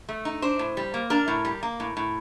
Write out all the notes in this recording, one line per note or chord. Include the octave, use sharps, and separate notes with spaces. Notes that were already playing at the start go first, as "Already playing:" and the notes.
A3
D#4
D4 C5
A2
G3
A#3
D4 A#4
A2
G3
A#3
A2
A2